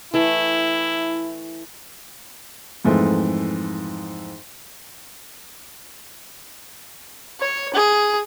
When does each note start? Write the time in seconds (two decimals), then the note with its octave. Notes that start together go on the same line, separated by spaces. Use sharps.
0.14 E3 A3 E4
2.85 F2 G#2 E3 A3
7.40 C#5
7.74 G#4